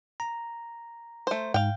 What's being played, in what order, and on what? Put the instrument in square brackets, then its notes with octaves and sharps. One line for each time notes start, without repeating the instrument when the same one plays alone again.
[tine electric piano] A#5
[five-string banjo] A3 C5
[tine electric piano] G#2 [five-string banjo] F5 G5